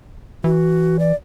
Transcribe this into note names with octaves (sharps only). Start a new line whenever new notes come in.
E3 F#4
D5